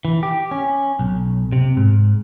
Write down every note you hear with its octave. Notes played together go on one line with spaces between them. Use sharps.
E3
G4
C#4
B1
C3
G#2